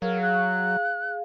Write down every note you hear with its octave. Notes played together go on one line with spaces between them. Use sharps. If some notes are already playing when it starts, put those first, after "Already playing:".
F#3 G#4 A#4 F5
F#6